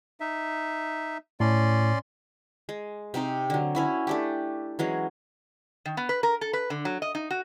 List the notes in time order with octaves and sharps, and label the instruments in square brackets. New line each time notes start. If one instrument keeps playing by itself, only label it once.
[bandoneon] D#4 E5
[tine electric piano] A2 [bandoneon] C#4 D5 C6
[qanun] G#3
C3 C4 D#4 G4
D3 F#3
C#4 E4 F#4
A3 D4 G4
E3 F#3 G#3 C#4
[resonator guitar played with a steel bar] D#3
B3
B4
A#4
A4
B4
D3
F#3
D#5
D#4
F#4